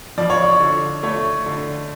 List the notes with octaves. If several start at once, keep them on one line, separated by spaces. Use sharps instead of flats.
F3 D5
C#5
D5
D3
A3 C#5
D3